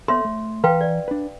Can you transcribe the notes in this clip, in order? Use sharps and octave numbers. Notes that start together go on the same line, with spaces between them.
B3 A4 C#5 E5 C6
A3
E3 B4 F5 G5 A#5 C6
D5
D4 B4